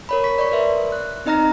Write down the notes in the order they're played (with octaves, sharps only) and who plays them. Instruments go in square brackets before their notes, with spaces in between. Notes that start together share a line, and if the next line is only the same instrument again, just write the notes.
[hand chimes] A#4 C#5 B5
C#6 B6
D5 C#6
A#4 B4 E5 C6
F#6
C4 D#4 D#5 A#5 F6 A#6